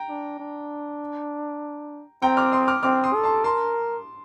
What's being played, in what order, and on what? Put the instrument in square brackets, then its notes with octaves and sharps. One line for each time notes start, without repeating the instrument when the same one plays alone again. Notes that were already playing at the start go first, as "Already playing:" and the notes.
Already playing: [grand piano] G5 A#5
[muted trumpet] D4
D4
[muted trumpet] C4 [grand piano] G5 A#5
[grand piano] D6 F6
C6 D#6
D6 F6
[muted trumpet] C4 [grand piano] D6 F6
[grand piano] C6 D#6
[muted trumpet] A4
[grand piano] A5 C6
[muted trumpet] A#4 [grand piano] A5 C6